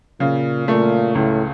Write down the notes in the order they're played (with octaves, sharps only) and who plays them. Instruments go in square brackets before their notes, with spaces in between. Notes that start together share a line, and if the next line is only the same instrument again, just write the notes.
[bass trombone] A#2 [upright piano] C#3
[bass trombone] A#2 [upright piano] A3
[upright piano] C#2 [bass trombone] A2